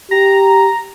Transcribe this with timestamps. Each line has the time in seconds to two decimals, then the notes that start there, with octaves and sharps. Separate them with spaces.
0.11 G4 A#5